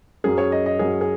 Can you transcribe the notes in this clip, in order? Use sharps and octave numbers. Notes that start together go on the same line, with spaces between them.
F#2 F#3 C#4 G#4
C#5
D#5
D#5
F#2 F#3 C#4 G#4
G#4